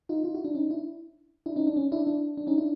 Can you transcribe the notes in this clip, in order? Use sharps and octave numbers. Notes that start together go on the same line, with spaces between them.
D#4 F4
D#4 F4
E4 F#4
D4
C#4 D#4
D4 E4
D4 E4
C#4 D#4
D4
C#4
D4 E4
D4
D4
C#4 D#4
D4 E4